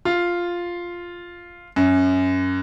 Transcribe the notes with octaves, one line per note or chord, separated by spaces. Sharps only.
F4
F#2